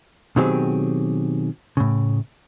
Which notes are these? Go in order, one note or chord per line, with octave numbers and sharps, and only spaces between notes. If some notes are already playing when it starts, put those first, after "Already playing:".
B2 D#3 F#3 C4 G4 G#4
A2 C#3